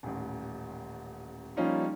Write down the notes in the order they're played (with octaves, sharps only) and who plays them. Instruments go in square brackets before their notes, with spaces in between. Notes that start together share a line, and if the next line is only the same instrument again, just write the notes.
[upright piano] D#1 A1
F3 G3 A#3 C#4 D#4 F4